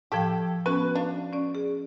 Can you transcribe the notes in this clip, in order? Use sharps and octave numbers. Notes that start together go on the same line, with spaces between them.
A2 F3 G4 A4 G5
B3 C#4 F#4 B4
D4 F5
C#4 D5
G#4